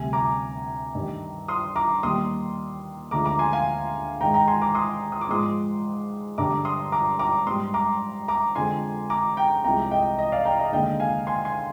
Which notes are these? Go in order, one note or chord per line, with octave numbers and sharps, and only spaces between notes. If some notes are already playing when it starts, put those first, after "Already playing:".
Already playing: D2 C3 G3 G#5
A#5 D6
G2 D#3 G3
C6 D#6
A#5 D6
D#2 D#3 G3 C6 D#6
D2 D3 F3 G#3 A#5 D6
A#5 D6
G#5 C6
F5 G#5
G#2 D#3 G#3 G5 A#5
G5 A#5
G#5 C6
A#5 D6
C6 D#6
D#6
D6
G#2 F3 G#3 C6 D#6
G2 D3 G3 A#5 D6
C6 D#6
A#5 D6
A#5 D6
G#2 G3 C6 D#6
A#5 D6
A#5 D6
F2 D3 F3 G#3 G#5 C6
A#5 D6
G5 A#5
C2 C3 F3 G#3 G5 A#5
D#5 G5
D#5
D5 F5
G5 A#5
D#5
D#2 D3 G#3 D#5 G5
F5 G#5
G#5 C6
G#5 C6